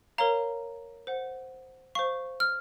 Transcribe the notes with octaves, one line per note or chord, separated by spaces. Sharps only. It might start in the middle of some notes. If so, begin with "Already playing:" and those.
A#4 C#5 F5 A#5
C5 F#5
C5 F5 C#6
F6